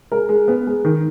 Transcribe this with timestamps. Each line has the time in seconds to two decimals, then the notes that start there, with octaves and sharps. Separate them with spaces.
0.12 G#3 A#4
0.29 G#3
0.48 B3
0.67 G#3
0.85 D#3